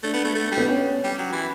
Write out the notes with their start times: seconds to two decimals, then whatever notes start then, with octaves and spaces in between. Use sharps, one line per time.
0.03 A3 D4
0.13 B3
0.24 A3
0.35 A3
0.51 G3
0.57 B3
0.68 C#4
1.04 G3
1.18 F#3
1.32 E3